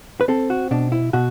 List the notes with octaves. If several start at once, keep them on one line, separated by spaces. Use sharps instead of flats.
B4
C4 A4
F#4
B2 D4
E4
B2 F#4